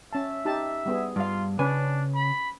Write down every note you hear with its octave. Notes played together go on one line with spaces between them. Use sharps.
C#4 E5 A5
D#4 G4 A5
G3 B3 G#4
G2 F4 F5
C#3 C#4 D4 B4 G#5
B5